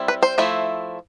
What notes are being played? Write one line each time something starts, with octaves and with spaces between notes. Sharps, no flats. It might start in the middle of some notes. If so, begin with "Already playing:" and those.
Already playing: G3 C4 E4
B4
C5
F3 A3 E4